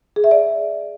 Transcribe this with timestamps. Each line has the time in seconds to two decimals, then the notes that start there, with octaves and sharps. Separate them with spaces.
0.16 G#4
0.24 E5
0.31 D5